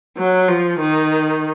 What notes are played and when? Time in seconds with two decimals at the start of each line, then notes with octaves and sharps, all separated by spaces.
0.18 F#3
0.48 F3
0.80 D#3